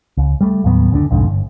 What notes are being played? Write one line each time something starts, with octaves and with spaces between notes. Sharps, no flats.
C#2
G3 A3
D#2 A2 F#3 B3
F#1 D2 D3 D4
B1 F2 G#2 D3
G1